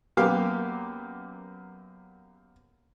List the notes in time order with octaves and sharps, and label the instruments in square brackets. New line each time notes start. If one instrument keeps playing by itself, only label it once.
[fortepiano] F#2 A#3 B3 G4 F5 D6